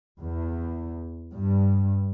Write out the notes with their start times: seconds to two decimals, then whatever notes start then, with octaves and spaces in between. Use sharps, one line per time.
0.20 E2
1.34 G2